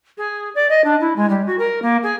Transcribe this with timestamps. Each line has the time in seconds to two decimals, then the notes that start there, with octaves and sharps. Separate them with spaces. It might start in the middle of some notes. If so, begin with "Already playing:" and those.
0.17 G#4
0.55 D5
0.69 D#5
0.84 D4
1.00 E4
1.16 G#3
1.29 G3
1.46 F#4
1.58 A#4
1.82 A#3
2.03 G#4